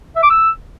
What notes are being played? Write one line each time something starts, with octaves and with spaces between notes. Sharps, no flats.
E5
D6
E6